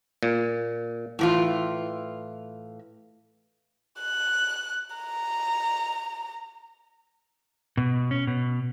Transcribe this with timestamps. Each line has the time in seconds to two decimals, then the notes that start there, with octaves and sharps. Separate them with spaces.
0.23 A#2
1.19 A2 E3 F4
4.01 F#6
4.96 A#5
7.77 B2
8.11 C#4
8.27 B2